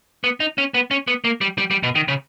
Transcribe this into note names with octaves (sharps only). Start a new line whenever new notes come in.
B3
D#4
C#4
B3
C#4
B3
A#3
G3
G3
G3
B2
D#3
C#3